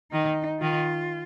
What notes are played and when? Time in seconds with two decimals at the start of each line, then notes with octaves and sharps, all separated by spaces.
0.12 D#3 D#4
0.61 D#3 F4